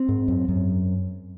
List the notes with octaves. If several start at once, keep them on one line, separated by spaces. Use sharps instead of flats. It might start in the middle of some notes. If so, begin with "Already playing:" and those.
Already playing: C4
G#2
F#2
F#2